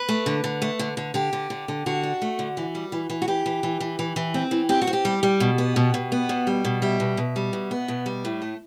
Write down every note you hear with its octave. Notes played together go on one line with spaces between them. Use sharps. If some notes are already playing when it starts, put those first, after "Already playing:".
Already playing: B4
A3
D3
D3
A3
D3
D3
D3 G4
D3
D3
D3
D3 F#4
D4
A3
D3
E3
G3
E3
E3
F#4
E3 G4
E3
E3
E3
E3
E3
C4
E3
C4 G4
F#4
C4
G4
G3
G3
B2
B3
B2
B2
B3
B2
G3
B2
G3 E5
B2
B2
G3
B2
B3
B2
G3
A2
A3